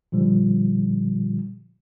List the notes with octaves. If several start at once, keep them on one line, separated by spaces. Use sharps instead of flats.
A#2 D3 F3 G3